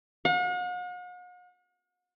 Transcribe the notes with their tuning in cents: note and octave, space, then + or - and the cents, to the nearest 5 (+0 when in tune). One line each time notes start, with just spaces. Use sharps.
F#5 -45